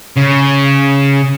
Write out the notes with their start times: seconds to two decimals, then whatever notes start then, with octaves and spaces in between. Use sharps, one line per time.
0.16 C#3